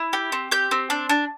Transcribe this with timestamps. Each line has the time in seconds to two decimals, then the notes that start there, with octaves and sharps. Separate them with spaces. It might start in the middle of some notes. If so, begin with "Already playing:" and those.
Already playing: E4
0.13 G4
0.32 C4
0.51 G4 G6
0.71 C4
0.90 D4
1.09 D4